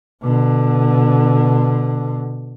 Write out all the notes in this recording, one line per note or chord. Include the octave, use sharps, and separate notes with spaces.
B2 D3